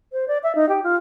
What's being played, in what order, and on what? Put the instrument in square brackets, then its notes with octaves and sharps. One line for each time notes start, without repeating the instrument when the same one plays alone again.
[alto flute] C5
D5
E5
D#4
G4
F4